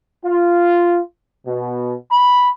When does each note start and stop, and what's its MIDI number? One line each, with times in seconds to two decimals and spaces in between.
0.25 0.98 65
1.46 1.94 47
2.11 2.48 83